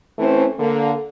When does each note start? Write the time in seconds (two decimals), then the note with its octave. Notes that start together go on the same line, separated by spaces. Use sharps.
0.19 E3 A3 C4 C#4 E4 C5
0.60 D3 A#3 A4